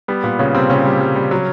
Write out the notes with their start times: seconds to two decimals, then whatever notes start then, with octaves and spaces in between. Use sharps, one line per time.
0.08 G3 B3
0.23 A#2 B3
0.39 A#2 C#3 C#4
0.54 C3 G3 C4
0.70 A#2 C#3 C#4
0.85 G3
1.01 G3
1.16 G3
1.31 F#3